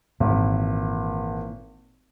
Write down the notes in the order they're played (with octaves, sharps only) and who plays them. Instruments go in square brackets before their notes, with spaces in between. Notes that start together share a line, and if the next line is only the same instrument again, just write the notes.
[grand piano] G#1 [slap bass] A#2 E3